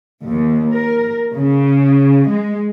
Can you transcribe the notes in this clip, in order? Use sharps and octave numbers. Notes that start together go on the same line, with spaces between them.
D#2
A#4
C#3
G#3